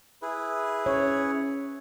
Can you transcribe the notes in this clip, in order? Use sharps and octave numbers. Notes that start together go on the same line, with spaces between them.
E4 G#4 B4
C#4 C#5